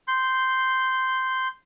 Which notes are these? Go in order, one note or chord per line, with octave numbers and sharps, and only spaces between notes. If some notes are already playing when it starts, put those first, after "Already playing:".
C6 G6